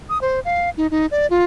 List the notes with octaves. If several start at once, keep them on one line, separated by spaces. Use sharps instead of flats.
D#6
C5
F5
D#4
D#4
D5
F4